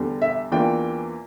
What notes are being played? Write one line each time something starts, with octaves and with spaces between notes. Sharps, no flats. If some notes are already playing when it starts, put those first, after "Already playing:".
Already playing: E2 D3 G3
E5
E2 E3 A#3 D4 F4 G5